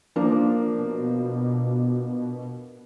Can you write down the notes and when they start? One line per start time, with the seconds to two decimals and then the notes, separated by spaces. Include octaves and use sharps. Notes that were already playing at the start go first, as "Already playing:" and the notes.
0.16 F3 A#3 D4
0.78 B2